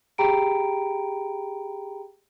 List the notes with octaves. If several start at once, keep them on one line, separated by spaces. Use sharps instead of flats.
G4 G#4 G5 A#5 B5 D7